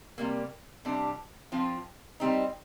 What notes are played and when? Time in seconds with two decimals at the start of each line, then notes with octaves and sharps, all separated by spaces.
0.18 C3 G3 A#3
0.85 C3 G3 D4
1.52 F3 C4 F4
2.20 G3 C4 D#4